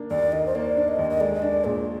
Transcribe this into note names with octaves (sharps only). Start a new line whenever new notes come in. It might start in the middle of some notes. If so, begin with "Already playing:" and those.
Already playing: D#3 A#3 D4
D#2 D5
D#3 D#5
C5
A#3 D5
D4
D#5
D#2
D#5
G#3 D5
D#5
D4 D5
A#2 G#4